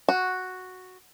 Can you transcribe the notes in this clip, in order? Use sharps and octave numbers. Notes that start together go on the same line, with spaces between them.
F#4